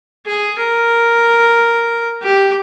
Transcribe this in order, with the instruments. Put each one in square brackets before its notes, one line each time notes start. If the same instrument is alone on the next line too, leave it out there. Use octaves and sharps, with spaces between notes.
[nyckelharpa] G#4
A#4
G4